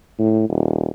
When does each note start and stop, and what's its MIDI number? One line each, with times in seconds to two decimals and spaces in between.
0.19 0.49 45
0.49 0.90 27